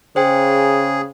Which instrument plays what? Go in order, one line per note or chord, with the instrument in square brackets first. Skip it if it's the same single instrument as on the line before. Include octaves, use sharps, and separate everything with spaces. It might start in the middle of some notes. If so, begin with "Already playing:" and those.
[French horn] C#3 [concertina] G#4 [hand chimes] C5 G5